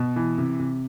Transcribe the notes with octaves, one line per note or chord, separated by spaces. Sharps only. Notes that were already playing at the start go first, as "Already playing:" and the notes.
Already playing: B2
E3
C3
C3